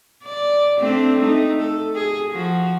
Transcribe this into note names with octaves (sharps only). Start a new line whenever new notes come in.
D5
A3 C4 D4
A3 D#4
A4
G#4
F3 F#4